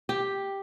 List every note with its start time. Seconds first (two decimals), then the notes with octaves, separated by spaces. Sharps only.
0.09 G4